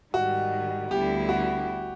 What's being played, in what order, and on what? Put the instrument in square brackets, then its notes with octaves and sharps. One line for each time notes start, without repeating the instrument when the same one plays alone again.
[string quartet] G#2 D#3 G3 [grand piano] F#4
[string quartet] D2 D3 G3 B3 E4 [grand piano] G4
[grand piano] F#4